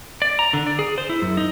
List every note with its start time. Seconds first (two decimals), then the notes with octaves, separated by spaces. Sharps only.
0.22 D5
0.39 A#5
0.53 D3
0.66 D5
0.79 G#4
0.98 C5
1.09 E4
1.22 F#2
1.37 D#4